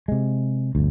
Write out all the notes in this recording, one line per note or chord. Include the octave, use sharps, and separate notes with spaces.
C3 G#3
G1 D2